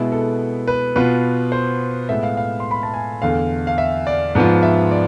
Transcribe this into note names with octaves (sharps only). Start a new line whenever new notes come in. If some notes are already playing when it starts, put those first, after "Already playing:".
Already playing: B2 G#3 B3 E4 B4
A4
B4
B2 B3 F4 B4
C5
A2 G#3 B3 E5
F5
F5
C6
B5
A5
G#5
E2 D3 A3 F5
F5
E5
D5
G#2 F3 B3 F4
E5
D5